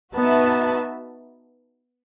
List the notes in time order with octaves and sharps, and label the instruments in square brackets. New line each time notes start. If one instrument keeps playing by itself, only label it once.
[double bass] B3 [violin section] D#4 F#4 B4 E5 A5